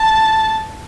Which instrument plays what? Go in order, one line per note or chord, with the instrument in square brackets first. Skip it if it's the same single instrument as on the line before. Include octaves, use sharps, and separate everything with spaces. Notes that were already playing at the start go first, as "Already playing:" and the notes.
Already playing: [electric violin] A5